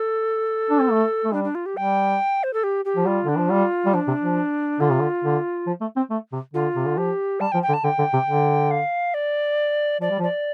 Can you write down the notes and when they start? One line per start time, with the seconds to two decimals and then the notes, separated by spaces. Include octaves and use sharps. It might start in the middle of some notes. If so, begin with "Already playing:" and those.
Already playing: A4
0.70 D4
0.80 C4
0.90 A3
1.25 A3
1.33 G3 D4
1.44 D4
1.55 F4
1.66 G4
1.77 G3 G5
2.43 C5
2.53 A4
2.64 G4
2.85 G4
2.96 F3
3.06 G3 F4
3.25 D3 D4
3.37 F3
3.50 G3 F4
3.86 G3
3.94 F3 D4
4.08 C3
4.22 F3
4.80 D3 F4
4.91 C3
5.00 D3
5.24 D3
5.67 F3
5.81 A3
5.97 C4
6.10 A3
6.33 C3
6.54 D3 F4
6.76 C3
6.86 D3
6.97 F3 G4
7.40 G3 A5
7.52 G5
7.55 F3
7.63 G5
7.69 D3
7.73 A5
7.84 D3 G5
7.99 D3
8.13 C3
8.27 D3
8.71 F5
9.14 D5
10.00 F3 D5
10.11 G3
10.19 F3
10.23 D5